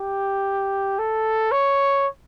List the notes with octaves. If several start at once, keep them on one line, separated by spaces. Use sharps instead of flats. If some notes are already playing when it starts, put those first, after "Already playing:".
Already playing: G4
A4
C#5